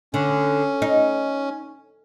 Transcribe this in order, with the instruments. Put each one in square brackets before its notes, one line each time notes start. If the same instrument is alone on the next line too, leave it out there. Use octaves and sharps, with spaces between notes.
[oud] D3 [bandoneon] C#4
[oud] D#4